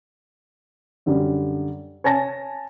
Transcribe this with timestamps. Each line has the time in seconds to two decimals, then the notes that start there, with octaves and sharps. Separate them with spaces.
1.06 F#2 D3 G3
2.04 C#5 G#5 A5 A#6